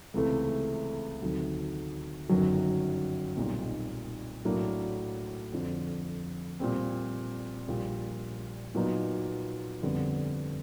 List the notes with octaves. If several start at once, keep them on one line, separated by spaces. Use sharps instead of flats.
C#2 C3 E3 A3
D2 C3 D#3 F#3
G1 F#2 D#3 F#3
B1 A#2 G3 C4 D#4
A2 F#3 A#3 D4
F2 D3 F3
A#2 G3 C4
A#1 A#2 G3
A#2 F#3 B3 D#4
G1 F2 D3 G3 B3